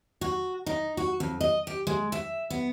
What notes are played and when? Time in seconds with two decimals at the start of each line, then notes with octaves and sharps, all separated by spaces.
0.21 F#4
0.66 D#4
0.97 F#4
1.20 F2
1.41 D#5
1.67 G4
1.87 G#3
2.12 E5
2.50 B3